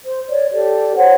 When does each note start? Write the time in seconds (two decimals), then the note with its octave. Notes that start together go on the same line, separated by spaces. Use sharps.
0.04 C5
0.29 C#5 D5
0.52 G4 A4 D5
0.97 C5 C#5 F#5